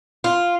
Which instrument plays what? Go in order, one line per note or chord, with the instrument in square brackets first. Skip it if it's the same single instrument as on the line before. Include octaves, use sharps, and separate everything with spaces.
[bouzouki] F4